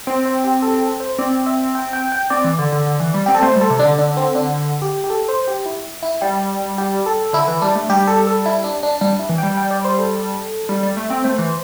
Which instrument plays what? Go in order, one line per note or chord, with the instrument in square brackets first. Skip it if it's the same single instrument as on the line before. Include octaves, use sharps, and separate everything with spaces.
[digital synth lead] C4 [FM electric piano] C5
[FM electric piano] C5
G4
A4
A4
C5
[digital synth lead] C4 [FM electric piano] D5
[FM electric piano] E5
G5
G5
G5
[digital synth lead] C4 [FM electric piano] D5
[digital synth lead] E3
D3
D3
D3
E3
G3
[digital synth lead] C4 [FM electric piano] G4
[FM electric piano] A4
[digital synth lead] A3 [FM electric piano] C5
[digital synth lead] G3
[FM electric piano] A4
[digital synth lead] C3
[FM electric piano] D4
[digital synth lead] D3
[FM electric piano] D4
C4
D4
G4
G4
A4
C5
G4
E4
E4
[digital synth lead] G3 [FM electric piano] G4
[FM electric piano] G4
A4
[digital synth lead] D3 [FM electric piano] E4
[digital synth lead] E3
[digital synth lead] G3 [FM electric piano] D4
[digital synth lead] A3
[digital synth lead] G3 [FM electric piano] G4
[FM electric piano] A4
A4
E4
D4
D4
[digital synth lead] G3 [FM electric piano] D4
[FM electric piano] E4
[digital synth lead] E3
[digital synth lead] G3 [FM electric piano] G5
[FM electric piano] G5
D5
C5
A4
[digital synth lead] G3
G3
A3
C4
[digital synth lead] A3 [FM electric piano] C5
[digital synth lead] E3